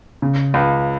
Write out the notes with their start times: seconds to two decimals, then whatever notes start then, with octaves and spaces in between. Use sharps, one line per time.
0.22 C#3
0.54 C#2